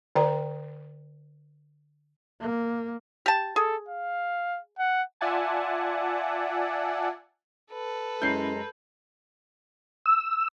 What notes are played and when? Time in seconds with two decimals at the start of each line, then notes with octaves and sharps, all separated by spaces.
0.15 D3 A#4 D5 G5 A#5
2.41 A#3
3.26 G4 A5
3.56 G#4 A4
3.88 F5
4.79 F#5
5.21 F4 D5 E5 F#5 G#5 A5
7.71 A4 B4
8.22 F#2 G#3 C#4 E4 A#5 G6 C7
10.06 E6